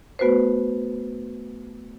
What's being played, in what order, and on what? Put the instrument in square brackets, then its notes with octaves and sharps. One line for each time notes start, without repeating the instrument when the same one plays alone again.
[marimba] A3 B3 F#4 B4 C5